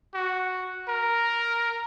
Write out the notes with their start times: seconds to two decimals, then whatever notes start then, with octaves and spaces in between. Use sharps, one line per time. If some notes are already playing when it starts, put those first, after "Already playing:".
0.14 F#4
0.88 A#4